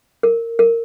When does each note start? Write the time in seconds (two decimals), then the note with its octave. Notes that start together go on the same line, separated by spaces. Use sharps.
0.23 A#4
0.59 A#4